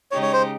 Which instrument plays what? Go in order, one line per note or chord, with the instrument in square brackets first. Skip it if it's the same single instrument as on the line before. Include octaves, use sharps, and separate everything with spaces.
[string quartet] C#3 G#3 D#4 G4 [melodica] C#5
[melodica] C#5
C5